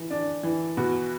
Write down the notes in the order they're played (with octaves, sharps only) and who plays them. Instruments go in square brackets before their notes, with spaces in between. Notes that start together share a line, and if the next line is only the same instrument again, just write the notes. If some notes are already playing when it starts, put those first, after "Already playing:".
Already playing: [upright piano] E3
D4
E3
B2 F#4